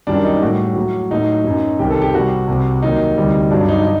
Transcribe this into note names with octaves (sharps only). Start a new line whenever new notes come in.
F#2 D#3 G3 D4
D#4
A2 G3 F#4
A2 F#3
A2 F#3 D#4
F#2 F#3
C2 C3 D#3 G4
A4
G4
C2 C3 G3 F#4
C2 C3 G3
D#2 D#3 F#3 D#4
D2 C3 G3
G2 F#3 D4
D#4
D#4